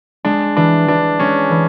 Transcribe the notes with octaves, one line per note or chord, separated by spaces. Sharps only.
G#3 D4
E3 D4
E3 D4
G#3 C#4
E3